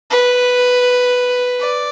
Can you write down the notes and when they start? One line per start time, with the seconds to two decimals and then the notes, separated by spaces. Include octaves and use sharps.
0.11 B4
1.59 D5